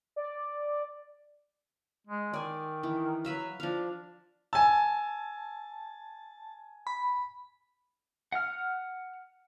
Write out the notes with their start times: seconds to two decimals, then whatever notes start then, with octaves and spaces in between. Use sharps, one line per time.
0.16 D5
2.07 G#3
2.34 D#3 D5 G#5
2.83 E3
3.25 F#3 B4 E5 F5
3.60 F3 D4 F5
4.53 G#5 A5 E6
6.87 B5
8.32 F#5 F6